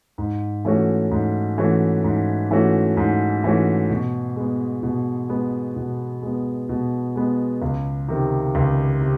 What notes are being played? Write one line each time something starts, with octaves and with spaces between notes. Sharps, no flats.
G#2
E3 A3 C#4 F#4
G#2
E3 A3 C#4 F#4
G#2
E3 A3 C#4 F#4
G#2
E3 A3 C#4 F#4
B2
G#3 B3
B2
G#3 B3
B2
G#3 B3
B2
G#3 B3
C#2
C3 D#3
C#2
C3